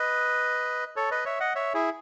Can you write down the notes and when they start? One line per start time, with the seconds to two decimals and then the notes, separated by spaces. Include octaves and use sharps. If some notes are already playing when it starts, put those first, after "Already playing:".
Already playing: B4 D#5
0.96 A4 C#5
1.11 B4 D#5
1.25 C#5 E5
1.40 D#5 F#5
1.55 C#5 E5
1.74 E4 G#4